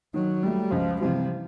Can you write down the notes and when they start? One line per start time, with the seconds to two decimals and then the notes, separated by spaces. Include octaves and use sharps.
0.14 D#3 F#3
0.43 F#3 G3 A3
0.71 C#2 F3
1.00 C3 E3 F3 G3